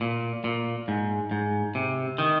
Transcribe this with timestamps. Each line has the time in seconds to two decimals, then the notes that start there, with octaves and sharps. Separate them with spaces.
0.01 A#2
0.44 A#2
0.88 G#2
1.31 G#2
1.75 C3
2.18 D#3